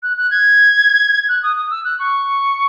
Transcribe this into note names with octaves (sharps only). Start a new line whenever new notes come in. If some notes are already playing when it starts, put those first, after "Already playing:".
F#6
F#6
G#6
F#6
D#6
D#6
E6
F#6
C#6